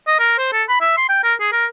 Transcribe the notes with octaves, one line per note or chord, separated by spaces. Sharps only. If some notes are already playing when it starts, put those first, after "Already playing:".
D#5
A#4
C5
A4
B5
E5
C6
G5
A#4
G#4
A#4